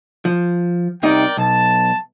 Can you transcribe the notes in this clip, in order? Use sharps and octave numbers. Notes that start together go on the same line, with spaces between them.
F3
C2 C3 D#4 A#4 D5 G5
B1 A5